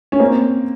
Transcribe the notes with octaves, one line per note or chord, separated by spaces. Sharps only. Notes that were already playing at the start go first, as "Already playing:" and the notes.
C#4
A#3 C4